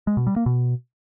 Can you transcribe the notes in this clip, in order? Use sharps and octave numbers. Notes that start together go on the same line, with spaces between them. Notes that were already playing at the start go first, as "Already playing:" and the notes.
G#3
B2
G3
A#3
B2